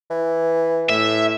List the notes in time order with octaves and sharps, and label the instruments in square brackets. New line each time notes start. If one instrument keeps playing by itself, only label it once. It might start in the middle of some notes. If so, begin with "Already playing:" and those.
[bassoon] E3
[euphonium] A2 [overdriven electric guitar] E5